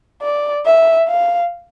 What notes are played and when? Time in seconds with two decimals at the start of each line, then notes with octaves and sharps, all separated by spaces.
0.22 D5
0.66 E5
1.08 F5